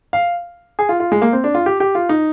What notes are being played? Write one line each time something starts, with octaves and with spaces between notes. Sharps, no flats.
F5
G#4
F4
F4
G#3
A#3
C4
D4
F4
G4
G4
F4
D#4